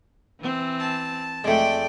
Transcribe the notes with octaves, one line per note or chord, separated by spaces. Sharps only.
E3 C4
A5
F2 G#3 A3 D5 G5